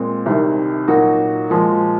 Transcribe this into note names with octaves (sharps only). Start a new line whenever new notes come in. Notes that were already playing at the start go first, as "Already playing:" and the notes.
Already playing: A#2 G#3 C4
C2 C3 D#3
A#2 F#3 A#3 D#4 F#4
A#2 F3 G#3